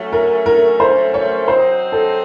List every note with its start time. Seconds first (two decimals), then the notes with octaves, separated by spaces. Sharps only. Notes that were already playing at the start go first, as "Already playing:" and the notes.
Already playing: F#3 A3 C#4
0.13 A#4
0.46 A#4
0.80 C5
1.14 C#5
1.48 F#3 C4 D#4 C5
1.92 A4